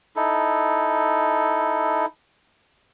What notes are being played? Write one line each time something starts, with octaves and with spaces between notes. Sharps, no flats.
D#4 E4 A4